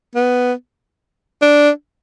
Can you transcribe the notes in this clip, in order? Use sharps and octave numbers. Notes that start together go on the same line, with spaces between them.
B3
D4